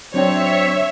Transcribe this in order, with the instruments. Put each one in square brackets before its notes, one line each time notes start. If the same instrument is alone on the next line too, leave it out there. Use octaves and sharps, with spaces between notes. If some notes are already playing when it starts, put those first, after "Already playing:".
[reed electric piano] F#3 D4 G5 [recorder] C4 [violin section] C#5 [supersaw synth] E5